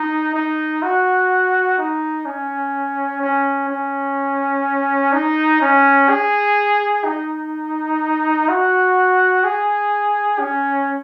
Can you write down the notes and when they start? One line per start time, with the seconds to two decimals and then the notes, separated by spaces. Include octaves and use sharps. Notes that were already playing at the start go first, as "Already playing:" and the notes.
Already playing: D#4
0.34 D#4
0.82 F#4
1.78 D#4
2.25 C#4
3.21 C#4
3.69 C#4
5.13 D#4
5.61 C#4
6.09 G#4
7.04 D#4
8.49 F#4
9.44 G#4
10.40 C#4